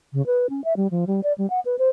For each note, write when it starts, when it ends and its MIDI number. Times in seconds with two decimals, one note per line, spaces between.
0.13 0.25 49
0.26 0.47 71
0.50 0.64 61
0.64 0.76 76
0.77 0.87 55
0.91 1.05 53
1.07 1.21 55
1.23 1.33 74
1.38 1.49 55
1.50 1.60 78
1.65 1.76 71
1.79 1.89 72